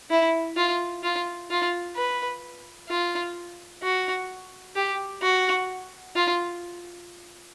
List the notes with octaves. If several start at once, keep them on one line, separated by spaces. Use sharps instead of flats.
E4
F4
F4
F4
B4
F4
F#4
G4
F#4
F4